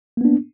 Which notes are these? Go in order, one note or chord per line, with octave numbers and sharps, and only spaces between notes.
A#3 B3 D4